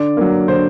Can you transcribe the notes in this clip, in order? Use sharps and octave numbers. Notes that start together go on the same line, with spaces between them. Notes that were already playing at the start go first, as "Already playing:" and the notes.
Already playing: D3 D5
F#3 A#3
D3 C5